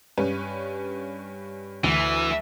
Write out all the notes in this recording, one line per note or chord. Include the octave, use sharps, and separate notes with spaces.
G2 C#4 B4
D2 E3